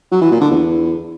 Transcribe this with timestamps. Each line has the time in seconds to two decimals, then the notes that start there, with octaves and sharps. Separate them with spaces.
0.11 F#3
0.21 E3
0.31 A#2
0.41 D3
0.51 E2